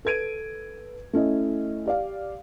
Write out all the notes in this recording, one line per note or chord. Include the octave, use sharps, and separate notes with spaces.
A4 B4 G#6 D7 D#7
A3 C#4 E4 D#5
G4 D5 F5